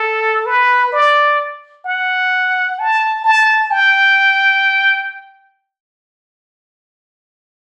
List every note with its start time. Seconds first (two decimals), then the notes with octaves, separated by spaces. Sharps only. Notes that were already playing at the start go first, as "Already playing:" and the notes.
Already playing: A4
0.46 B4
0.92 D5
1.86 F#5
2.79 A5
3.24 A5
3.71 G5